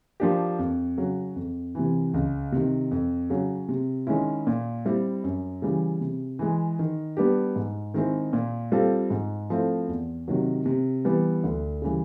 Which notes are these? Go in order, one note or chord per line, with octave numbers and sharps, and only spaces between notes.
F3 A#3 D4 G4
F2
C#3 F#3
F2
C3 E3
C#2
C3 D#3
F2
C#3 F#3
C3
D#3 G#3 C#4 E4
A#2
G3 C4 E4
F#2
C#3 E3 G3
C3
E3 G#3
D#3
G3 B3 D4 G4
G#2
D#3 G#3 C4 E4
A#2
G3 C4 F4 A4
G#2
F3 A3 C4 E4
E2
C3 D#3 F#3
C3
E3 G3 B3
D2
C#3 E3 G3